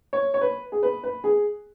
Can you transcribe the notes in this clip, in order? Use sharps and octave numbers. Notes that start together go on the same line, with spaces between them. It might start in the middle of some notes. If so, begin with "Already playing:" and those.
C#5
C#5
B4
G#4
B4
B4
G#4